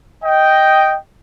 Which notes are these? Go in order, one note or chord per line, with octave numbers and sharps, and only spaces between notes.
D#5 G5